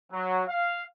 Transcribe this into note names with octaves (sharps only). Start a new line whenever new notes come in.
F#3
F5